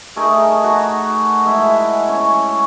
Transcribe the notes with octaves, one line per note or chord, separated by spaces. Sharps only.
A3 D#4 G#4 A#4
F#4
G#3 E4
C#4 C#5